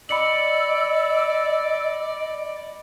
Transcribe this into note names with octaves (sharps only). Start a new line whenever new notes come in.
D5 D#5 B5 E6 C#7 F#7